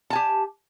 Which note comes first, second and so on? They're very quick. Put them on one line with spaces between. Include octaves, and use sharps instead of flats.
A5 G#5 G4